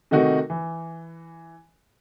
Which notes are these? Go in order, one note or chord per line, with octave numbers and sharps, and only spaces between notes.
C3 D#3 A3 D#4 F#4
E3